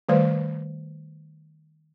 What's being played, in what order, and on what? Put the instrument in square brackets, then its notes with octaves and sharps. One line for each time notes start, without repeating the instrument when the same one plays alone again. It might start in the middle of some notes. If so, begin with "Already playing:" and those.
[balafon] D#3 G3 A3 B4 C5